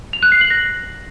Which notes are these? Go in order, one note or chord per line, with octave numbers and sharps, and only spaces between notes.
F7
F#6
C7
F#7
A#6